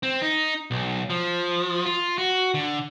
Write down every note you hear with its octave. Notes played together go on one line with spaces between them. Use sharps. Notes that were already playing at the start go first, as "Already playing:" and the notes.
C4
D#4
B1
F3
F4
F#4
D3